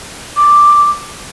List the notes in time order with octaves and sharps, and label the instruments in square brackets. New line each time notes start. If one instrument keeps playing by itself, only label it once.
[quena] D6